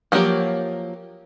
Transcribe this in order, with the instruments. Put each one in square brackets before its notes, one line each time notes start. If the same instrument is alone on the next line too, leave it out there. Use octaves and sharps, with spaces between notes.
[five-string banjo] F3 F#3 A#3 G4 C#5